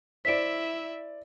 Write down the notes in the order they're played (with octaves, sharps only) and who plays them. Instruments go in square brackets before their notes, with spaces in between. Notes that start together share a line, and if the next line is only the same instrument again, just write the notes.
[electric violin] E4 E5 [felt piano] C5 D5 [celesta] B6 D7